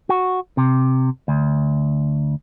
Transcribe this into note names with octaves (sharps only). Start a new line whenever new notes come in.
F#4
C3
D2